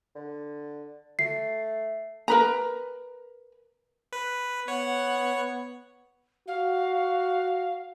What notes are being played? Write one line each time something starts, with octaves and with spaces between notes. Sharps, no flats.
D3
A3 C7
A#4 B4 A#5
B4
B3 C#5 F#5
F#4 F5